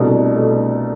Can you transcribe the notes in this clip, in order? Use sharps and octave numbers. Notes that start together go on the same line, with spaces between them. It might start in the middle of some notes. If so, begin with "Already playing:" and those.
Already playing: C2 B2 A3 D4
B2 A3 D4